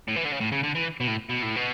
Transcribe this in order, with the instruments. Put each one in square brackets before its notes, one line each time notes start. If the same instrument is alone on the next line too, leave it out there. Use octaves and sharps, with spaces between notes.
[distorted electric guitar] A2
E3
D3
C#3
A2
C#3
D3
E3
B2
A2
B2
A2
B2